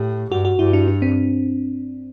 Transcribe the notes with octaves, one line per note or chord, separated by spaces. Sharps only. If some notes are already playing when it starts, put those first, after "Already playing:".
Already playing: A2 G4
G2 F#4
F#4
G2 E4
D4
D4
C4